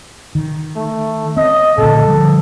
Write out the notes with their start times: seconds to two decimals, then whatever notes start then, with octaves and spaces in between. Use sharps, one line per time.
0.35 D#3
0.76 A3
1.37 C4 D#5
1.78 D2 A#2 A4
2.08 D3 F3 G3